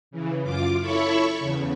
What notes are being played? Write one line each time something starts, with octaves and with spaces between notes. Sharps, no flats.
C#3 E3
F#2 F4 D6
E4 A4 C#5 B5 C#6
E2 C#3